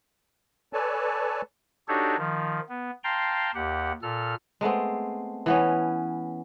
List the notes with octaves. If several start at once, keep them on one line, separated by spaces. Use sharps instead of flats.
A4 B4 C#5 D5 G#5 A5
D4 D#4 F#4 G4 A4 C#5
D#3 F3
B3
F5 G5 A5 A#5 C6
D#2 G4 F#5
A#2 A4 F6
G#3 A3 B3 C4
E3 B3 C#4